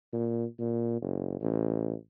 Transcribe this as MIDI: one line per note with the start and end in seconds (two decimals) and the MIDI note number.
0.13 0.45 46
0.59 1.01 46
1.01 1.39 30
1.41 1.93 33